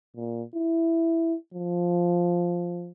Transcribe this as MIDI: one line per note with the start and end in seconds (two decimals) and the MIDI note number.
0.16 0.43 46
0.55 1.35 64
1.54 2.92 53